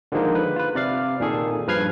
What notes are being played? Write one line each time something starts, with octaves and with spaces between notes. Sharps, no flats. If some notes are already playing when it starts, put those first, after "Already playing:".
D3 D#3 F3 G#3 A#3 D#4
B4
F4 B4
C3 D5 F5
A#2 D#3 G#4 A4
G2 F3 B4 F6 G#6 C7